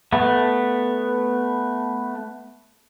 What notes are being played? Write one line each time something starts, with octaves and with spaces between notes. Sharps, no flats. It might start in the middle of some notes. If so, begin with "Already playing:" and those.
A3 B3